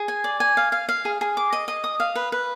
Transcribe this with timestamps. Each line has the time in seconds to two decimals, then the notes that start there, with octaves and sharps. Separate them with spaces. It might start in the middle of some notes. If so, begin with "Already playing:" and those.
Already playing: G#4
0.08 G#5
0.24 D5
0.40 G#5
0.57 F5
0.72 F5
0.89 F5
1.05 G#4
1.21 G#4
1.37 D6
1.53 D#5
1.68 D#5
1.84 D#6
2.00 F5
2.15 B4
2.32 B4